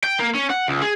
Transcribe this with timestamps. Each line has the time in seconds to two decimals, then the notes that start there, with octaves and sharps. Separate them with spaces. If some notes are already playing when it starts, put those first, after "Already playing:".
0.04 G5
0.19 A#3
0.35 C#4
0.50 F#5
0.68 C#2
0.82 G#4